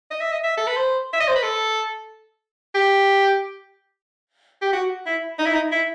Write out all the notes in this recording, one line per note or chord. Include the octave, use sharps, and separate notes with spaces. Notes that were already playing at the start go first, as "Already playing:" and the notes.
D#5
E5
D#5
E5
A4
B4
C5
E5
D#5
C5
B4
A4
G4
G4
F#4
E4
D#4
E4
D#4
E4